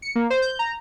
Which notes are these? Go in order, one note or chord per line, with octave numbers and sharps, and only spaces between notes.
C#7
A#3
C5
G6
A#5